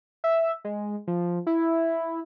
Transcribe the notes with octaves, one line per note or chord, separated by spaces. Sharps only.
E5
G#3
F3
E4